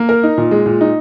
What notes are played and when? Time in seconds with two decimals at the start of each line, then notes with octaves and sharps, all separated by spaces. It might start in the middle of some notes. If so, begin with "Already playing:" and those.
Already playing: A#3
0.09 A#4
0.23 D#4
0.38 A#2
0.51 G#3
0.66 A#2
0.81 D#4